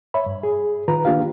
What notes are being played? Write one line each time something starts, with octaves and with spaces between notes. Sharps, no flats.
C#5 E5 B5
G2
G#4
D#3 F4 B4 A#5
A#3 D4 F4 G4 F5